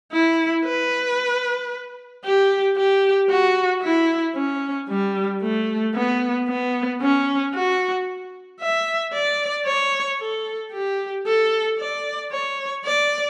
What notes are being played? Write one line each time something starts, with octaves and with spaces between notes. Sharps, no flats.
E4
B4
G4
G4
F#4
E4
C#4
G3
A3
B3
B3
C#4
F#4
E5
D5
C#5
A4
G4
A4
D5
C#5
D5